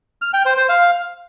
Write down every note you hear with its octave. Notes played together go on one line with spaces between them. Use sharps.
F6
G5
C5
C5
F5